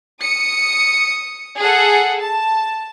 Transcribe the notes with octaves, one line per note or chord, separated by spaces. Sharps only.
D#6 C#7
G#4 A4 F#5
A5